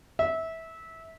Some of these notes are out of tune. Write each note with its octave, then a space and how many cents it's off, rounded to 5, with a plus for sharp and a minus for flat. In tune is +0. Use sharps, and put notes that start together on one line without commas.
E5 -20